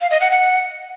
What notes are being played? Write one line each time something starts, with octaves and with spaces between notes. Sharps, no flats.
F5
D#5
F#5
F#5